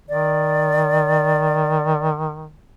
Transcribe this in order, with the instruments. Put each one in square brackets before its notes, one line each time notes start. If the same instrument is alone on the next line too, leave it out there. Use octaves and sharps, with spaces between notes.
[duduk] D#3 [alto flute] D5